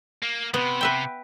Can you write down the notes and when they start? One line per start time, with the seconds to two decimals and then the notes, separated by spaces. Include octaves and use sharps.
0.23 A#3
0.54 C3 B3
0.81 B4 E5 G5